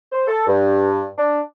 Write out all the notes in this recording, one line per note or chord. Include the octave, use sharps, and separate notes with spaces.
C5
A4
G2
D4